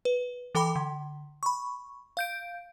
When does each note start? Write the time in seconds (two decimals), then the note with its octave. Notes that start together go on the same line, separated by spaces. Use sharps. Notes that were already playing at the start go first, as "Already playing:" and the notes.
0.05 B4
0.55 E3 A4 G5 B5 D6
0.76 D3
1.43 B5 C#6
2.17 F5 G6 D7